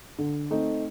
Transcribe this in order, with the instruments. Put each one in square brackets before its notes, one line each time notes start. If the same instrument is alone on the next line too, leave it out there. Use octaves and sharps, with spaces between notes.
[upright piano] D3
A3 C4 D#4